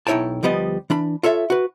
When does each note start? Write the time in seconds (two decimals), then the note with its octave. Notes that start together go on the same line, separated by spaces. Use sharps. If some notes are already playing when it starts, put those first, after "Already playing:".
0.07 B1 D#4 E4 C#5 G5 A5
0.43 D2 F3 G3 B3 D#5
0.90 E3 D4 B5
1.23 F4 A4 C#5 E5
1.50 F#4 B4